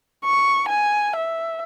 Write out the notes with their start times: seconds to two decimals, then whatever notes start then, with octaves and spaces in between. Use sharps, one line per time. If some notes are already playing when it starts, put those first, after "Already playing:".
0.25 C#6
0.69 G#5
1.16 E5